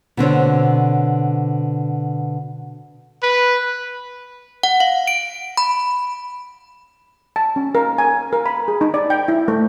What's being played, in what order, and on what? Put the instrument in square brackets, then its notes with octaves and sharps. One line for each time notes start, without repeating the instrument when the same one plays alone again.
[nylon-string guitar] B2 D3 C4 C#5
[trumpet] B4
[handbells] F#5
F5
D7
B5
[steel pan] A5
C#4
A#4
G#5
A#4
B5
G#4
D#4
D5
G5
E4
A3